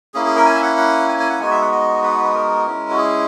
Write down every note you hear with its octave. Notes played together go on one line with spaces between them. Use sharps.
A#3 C#4 E4 G#4
G#4
A#4
G#5
E5
F#5
F#5
G#5
G#5
F#5
G#3 B3 D#4 F#4 G#5
E5
F#5
D#5
B4
B4
A#4
G#3 C#4 E4
F#4
G#4